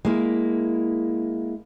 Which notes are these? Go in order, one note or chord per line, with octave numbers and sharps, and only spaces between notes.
G#3 A#3 E4